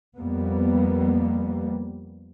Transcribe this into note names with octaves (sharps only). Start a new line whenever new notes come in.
F2 G3 A#3 B3